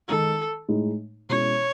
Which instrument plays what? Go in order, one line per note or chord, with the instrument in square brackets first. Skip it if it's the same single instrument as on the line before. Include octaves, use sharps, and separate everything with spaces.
[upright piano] D#3 G#3 D#4 [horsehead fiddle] A4
[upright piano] A2 G#3 D#4
[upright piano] B2 G#3 C#4 E4 [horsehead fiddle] C#5